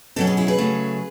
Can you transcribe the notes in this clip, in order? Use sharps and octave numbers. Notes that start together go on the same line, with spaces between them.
B2 F#3 C#4 A4 C#5
G#4 B4
E4 G#4
G#4 B4
C#3 F#3 A3